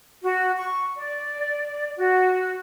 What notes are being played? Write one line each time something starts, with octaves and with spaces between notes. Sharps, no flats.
F#4
C#6
D5
F#4